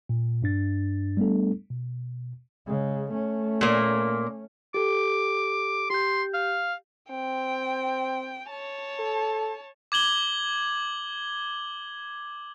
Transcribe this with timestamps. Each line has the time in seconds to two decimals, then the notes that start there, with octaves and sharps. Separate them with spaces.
0.09 A#2
0.42 G2 D4 A6
1.17 G3 A3 B3 D4 A4
1.70 B2
2.67 C#3 G#3
3.11 A3 C#4
3.61 A#2 A#3
4.74 G4 A4 D6
5.90 G4 C6 G6
6.34 F5
7.11 C4 G5
8.49 C#5 A5
8.99 A4
9.92 D6 G#6 F#7 G7